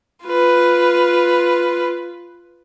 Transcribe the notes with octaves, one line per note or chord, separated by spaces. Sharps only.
F4 B4